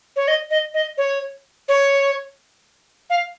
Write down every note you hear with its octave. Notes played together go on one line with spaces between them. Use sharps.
C#5
D#5
D#5
D#5
C#5
C#5
F5